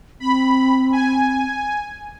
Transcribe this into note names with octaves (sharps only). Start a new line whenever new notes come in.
C4 B5
G#5